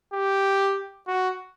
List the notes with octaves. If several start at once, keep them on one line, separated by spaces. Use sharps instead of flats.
G4
F#4